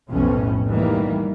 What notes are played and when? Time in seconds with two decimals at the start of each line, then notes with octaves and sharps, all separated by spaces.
0.11 B1 F2 A2 C#4
0.67 D2 D#3 E3 G3 A#3